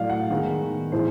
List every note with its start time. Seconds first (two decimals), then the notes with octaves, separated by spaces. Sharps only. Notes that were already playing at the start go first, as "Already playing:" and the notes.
Already playing: A2 F#3 A3 D5 F5
0.10 F#5
0.30 D#3 G#3 B3
0.91 A2 E3 G#3 C5